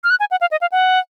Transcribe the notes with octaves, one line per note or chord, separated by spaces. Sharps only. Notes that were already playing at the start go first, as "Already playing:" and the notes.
F6
F#6
G#5
F#5
F5
D#5
F5
F#5